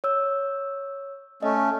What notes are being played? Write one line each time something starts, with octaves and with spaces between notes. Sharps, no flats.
C#5 E6
A3 C#4 D#5